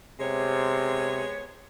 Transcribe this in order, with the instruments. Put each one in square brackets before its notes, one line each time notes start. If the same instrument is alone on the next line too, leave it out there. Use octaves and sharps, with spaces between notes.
[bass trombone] C3 [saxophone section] G#3 B3 C#5